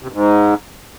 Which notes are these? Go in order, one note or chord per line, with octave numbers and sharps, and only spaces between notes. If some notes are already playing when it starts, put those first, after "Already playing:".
C3
G2
G#2